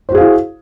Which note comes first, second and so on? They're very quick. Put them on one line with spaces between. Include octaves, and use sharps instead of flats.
C5 F#4 G#4 F5 E4